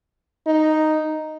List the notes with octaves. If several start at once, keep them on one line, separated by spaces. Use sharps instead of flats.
D#4